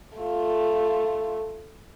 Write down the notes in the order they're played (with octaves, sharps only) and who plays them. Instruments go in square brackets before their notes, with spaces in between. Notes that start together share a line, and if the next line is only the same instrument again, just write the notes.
[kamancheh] A3 F4